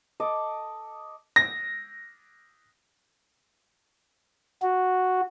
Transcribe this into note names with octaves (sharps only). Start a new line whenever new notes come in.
A4 D#5 D6
A#6
F#4